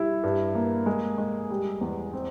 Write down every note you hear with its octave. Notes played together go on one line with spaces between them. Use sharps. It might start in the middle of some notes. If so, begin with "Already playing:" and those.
Already playing: G3 E4
G2
A#3
G#3
G#3
G3
E2
C4